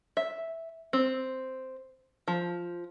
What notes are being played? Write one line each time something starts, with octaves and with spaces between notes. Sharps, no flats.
E5
C4
F3